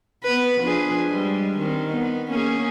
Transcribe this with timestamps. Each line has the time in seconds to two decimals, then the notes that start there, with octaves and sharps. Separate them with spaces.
0.24 B3 B4
0.61 F3 D4 G#4
1.05 G3 G#3
1.58 D#3 C4
1.92 B3
2.29 A#3 C#4 G#4